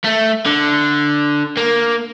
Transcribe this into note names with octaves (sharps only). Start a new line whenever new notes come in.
A3
D3
A#3